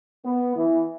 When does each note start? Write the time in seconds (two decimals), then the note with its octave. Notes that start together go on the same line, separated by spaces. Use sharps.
0.25 B3
0.56 E3